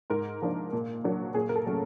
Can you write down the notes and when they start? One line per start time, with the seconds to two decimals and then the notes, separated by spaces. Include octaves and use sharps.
0.10 G#2 A#4
0.42 F3 A#3 D4
0.73 A#2
1.04 F#3 A#3 D4
1.34 A#2 G#4
1.49 A#4
1.56 A4
1.66 F#3 A3 C#4